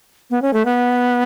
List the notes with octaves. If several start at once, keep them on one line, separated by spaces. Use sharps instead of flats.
B3
C#4
A3
B3